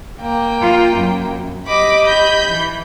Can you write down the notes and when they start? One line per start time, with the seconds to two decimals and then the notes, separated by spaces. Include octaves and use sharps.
0.21 A#3 G5
0.62 F4
0.97 F#2
1.66 G4 D#5 B5 D6
2.05 B5 G6
2.45 E3